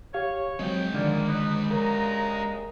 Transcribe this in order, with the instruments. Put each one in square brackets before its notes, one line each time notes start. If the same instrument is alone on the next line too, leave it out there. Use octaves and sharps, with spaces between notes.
[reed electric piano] G4 F5 [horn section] C#5
[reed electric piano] F#3 C4 [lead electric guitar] G#3 G5
[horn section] A#2 A#3 D5 [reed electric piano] D3 D#3 F3
[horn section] C#4 D#4 B4
[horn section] G2 C#3 A#5 [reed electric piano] A#4